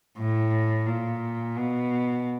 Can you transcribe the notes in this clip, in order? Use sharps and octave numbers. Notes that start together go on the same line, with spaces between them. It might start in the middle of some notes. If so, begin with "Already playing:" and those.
A2
A#2
B2